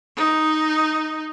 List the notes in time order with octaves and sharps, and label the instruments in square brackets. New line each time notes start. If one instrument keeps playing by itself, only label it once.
[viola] D#4